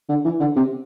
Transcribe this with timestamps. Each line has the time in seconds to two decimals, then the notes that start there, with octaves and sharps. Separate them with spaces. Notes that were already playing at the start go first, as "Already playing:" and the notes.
0.09 D3
0.25 E3
0.40 D3
0.56 C3